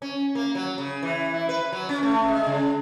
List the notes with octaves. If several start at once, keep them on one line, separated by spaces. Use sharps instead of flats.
C#4
A#3
F#3
C#3
E3
E4
B4
F#3
C#4
A3
G#3
C#3